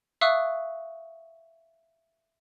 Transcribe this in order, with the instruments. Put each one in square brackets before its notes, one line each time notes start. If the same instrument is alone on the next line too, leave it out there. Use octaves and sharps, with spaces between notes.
[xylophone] E5 F5 C#6 D#6 E6 F#6